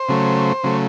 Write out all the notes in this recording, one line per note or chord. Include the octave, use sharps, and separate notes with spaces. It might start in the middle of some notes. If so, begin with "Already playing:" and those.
Already playing: C5
C#3 F#3 A3
C#3 F#3 A3